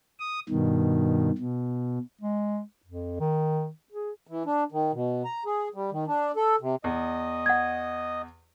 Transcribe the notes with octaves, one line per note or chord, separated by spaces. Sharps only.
D#6
G2 B2 D#3
B2
G#3
F2
D#3
G#4
E3
D4
D#3
B2
A#5
G#4
G3
D#3
D4
A4
C3
E2 D#5 D#6
F#5 G#6